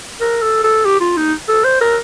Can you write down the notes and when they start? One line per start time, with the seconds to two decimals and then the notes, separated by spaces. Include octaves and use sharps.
0.21 A#4
0.42 A4
0.64 A4
0.85 G4
1.00 F4
1.17 D#4
1.48 A4
1.64 C5
1.81 A#4